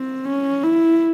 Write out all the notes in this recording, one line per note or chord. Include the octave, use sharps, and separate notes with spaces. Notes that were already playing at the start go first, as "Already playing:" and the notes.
Already playing: C4
C#4
E4